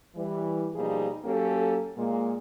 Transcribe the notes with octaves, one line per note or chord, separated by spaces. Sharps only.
E3 G3
B2 F3 G3 A#3 D#4 G#4
F#3 A#3 C#4 G4 A4
A#2 G#3 A#3